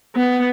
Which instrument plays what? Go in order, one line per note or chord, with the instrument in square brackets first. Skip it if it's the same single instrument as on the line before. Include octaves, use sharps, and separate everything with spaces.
[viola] B3